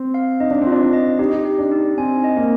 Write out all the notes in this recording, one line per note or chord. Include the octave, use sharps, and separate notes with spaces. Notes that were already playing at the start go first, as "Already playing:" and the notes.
Already playing: C4
F5
D#4 D#5
D4
C4
D4 F4
D#5
D#4 G4
G4
D4
D#4
C4 G#5
D#5
A#3